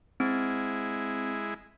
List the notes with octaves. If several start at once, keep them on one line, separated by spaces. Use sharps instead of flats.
G#3 C4 E4